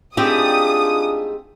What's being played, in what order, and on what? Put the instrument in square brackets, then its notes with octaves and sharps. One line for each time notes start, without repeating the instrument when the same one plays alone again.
[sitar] G#2 A3 [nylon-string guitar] C4 G4 [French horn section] D4 F4 G#4 [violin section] D#6